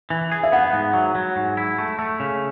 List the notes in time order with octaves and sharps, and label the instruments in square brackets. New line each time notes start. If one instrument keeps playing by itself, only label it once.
[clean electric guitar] E3
G#4
[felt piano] E5
[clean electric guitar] B3 [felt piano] F#5
[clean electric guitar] G#2
F#3
F#3
G#2
E4
A3
A3
C#3